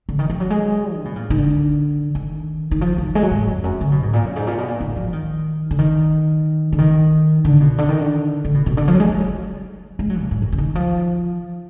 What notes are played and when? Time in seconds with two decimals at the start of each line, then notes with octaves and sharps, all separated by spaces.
0.09 D3
0.19 D#3
0.30 F3
0.40 F#3
0.50 G#3
0.94 D3
1.05 B2
1.16 A#2
1.30 D#3
1.38 D3
2.15 D#3
2.71 D#3
2.81 F3
2.98 D#3
3.15 G#3
3.23 F#3
3.31 G#2
3.48 F2
3.64 F#2
3.81 D3
3.92 B2
4.03 G#2
4.13 A#2
4.25 F#2
4.36 G#2
4.47 A#2
4.58 B2
4.68 A#2
4.80 G#2
4.96 F3
5.13 D#3
5.71 D3
5.79 D#3
6.72 D3
6.78 D#3
7.45 D3
7.61 B2
7.78 D3
7.89 D#3
7.99 D3
8.45 D3
8.54 B2
8.66 B2
8.77 D3
8.88 F3
8.94 F#3
9.00 G#3
9.10 F#3
9.21 F#3
9.99 G#3
10.10 F#3
10.21 A#2
10.31 G#2
10.42 F#2
10.52 D3
10.58 D#3
10.75 F3